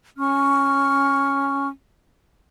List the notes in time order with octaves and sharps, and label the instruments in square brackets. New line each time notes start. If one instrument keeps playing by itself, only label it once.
[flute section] C#4 C#6 F6